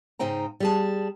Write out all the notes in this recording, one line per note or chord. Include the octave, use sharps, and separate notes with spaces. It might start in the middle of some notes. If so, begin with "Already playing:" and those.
G#2 C#3 D#4 C5 G5 A#5
G3 G#4 A5